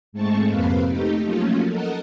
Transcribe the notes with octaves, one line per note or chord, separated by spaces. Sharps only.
G#2 G#3 A3 C4 A5 C#6
F2 C3 A#3 C4 B4 F5
A3 D#4 G4
F3 F#3 A3 A#3 C#4 F4
A4 A#4 D#5 F#5